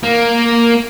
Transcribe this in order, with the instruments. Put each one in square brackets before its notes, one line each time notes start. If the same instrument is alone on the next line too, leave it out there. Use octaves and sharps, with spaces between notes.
[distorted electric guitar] A#3